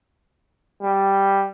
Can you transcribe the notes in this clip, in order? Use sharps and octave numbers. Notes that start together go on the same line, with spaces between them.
G3